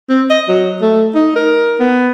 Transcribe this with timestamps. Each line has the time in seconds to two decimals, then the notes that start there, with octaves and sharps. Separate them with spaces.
0.09 C4
0.30 D#5
0.49 F#3
0.81 A3
1.15 D#4
1.36 A#4
1.80 B3